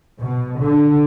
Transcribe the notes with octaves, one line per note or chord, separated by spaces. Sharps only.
B2
D3